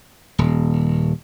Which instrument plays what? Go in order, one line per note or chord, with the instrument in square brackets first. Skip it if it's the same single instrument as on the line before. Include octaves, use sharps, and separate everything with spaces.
[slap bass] D#1